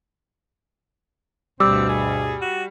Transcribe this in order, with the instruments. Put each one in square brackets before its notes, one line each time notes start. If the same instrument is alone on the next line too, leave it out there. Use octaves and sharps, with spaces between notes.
[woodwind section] D2 G2 B2 [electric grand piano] G3 [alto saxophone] C4 [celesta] D6 E6
[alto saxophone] G#4
F#4